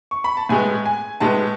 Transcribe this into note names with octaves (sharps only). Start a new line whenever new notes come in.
C#6
B5
A5
A2 G#3 B3 G#5
G#5
A2 G#3 B3 A5